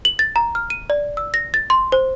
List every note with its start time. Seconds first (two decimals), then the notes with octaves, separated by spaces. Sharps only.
0.05 F#7
0.19 A6
0.36 A#5
0.55 F6
0.70 D#7
0.90 D5
1.17 E6
1.34 A#6
1.54 A6
1.70 C6
1.92 C5